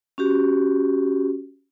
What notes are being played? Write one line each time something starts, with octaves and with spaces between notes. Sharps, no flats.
C#4 F#4 G4